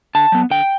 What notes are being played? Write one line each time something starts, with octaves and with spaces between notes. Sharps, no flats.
D3 A5
F#3 B3
D3 G5